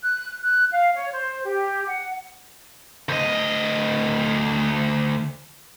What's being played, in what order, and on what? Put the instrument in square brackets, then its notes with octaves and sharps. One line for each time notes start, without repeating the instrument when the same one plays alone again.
[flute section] F#6
F#6
F5
C#5
C5
G4
F#5
[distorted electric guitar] D2 D#5